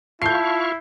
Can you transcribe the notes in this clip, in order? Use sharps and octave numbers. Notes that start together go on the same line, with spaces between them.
E4 F4 F5 A5 C#6 G6 C7